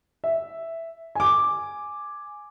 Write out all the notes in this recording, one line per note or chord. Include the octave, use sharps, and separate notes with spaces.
E5
G#5 D6